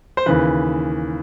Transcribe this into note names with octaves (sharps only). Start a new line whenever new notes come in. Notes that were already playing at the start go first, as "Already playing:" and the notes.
C5
D#2 C#3 E3 B4